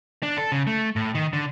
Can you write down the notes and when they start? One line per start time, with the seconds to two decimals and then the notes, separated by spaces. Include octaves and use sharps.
0.23 D4
0.38 A4
0.52 C#3
0.67 A3
0.96 A2
1.15 D#3
1.33 D3